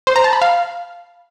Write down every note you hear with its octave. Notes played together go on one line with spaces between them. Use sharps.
C5
A#5
A5
B5
F5